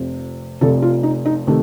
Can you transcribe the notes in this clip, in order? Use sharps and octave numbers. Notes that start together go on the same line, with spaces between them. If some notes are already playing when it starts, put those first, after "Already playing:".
Already playing: F1 F2 C3 F3
F1 F2 C3 F3 A4
F4
D#4
D#4
C3 D#3 A3